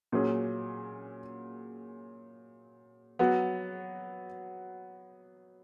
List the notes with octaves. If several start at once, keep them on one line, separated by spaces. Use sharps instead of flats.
A#2 F#3 C#4 G#4
F#3 B3 F#4